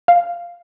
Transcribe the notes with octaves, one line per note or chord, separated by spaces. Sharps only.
F5